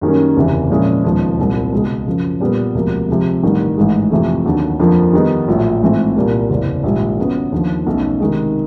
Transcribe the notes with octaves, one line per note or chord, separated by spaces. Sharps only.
F#2 D#3 G3 A#3 C#4
F#1 E2 C3 E3
A#2 F3 G#3 C#4 E4
E1 D#2 C#3 F3
C2 A#2 G3 C4
C#2 B2 G#3
F#2 C#3 F3
A#2 G3 B3
E1 D2 C3 F3 A#3
C3 F3 G#3
A1 G2 D#3 G3
A1 G#2 E3 G#3
F2 C3 E3 A3
D#2 D3 F#3
F2 D3 F3 A#3
D#3 G3 B3 D#4 G#4
A#1 A2 F#3
A1 G#2 E3 A3 C4
C2 A#2 G3 A#3
F#1 E2 C3
A#1 G#2 D#3 G3
C#3 F#3 B3
D#2 D3 F3
B1 B2 F#3 A3 C#4
C3 D#3 G#3